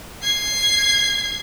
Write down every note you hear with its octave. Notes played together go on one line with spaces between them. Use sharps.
G#6 C7